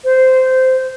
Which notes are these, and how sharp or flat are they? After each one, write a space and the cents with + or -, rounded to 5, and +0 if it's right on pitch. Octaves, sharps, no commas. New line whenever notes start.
C5 -10